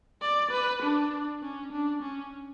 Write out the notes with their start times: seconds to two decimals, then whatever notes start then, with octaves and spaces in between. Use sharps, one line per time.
0.21 D5
0.51 B4
0.82 D4
1.42 C#4
1.72 D4
2.02 C#4